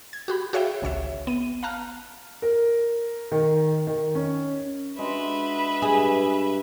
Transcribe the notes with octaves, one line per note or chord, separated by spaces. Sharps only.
G#6
F#4 G4 B5
F#4 G#4 C#5 E5 F5 G5
G#1 C#2 C#5 E5
B3 D#7
F5 A5 A#5 F6 F#6
A#4
D#3
D#3
C#4
G#3 D4 F#4 B4 E5
G2 G#4